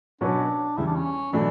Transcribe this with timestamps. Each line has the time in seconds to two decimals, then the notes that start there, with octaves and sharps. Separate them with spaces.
0.21 B2 F#3 C#4 D4 F#4 B4
0.77 E2 C#3 G3 E4
0.87 D4
0.96 C#4
1.33 B2 E3 F#3 A3 D4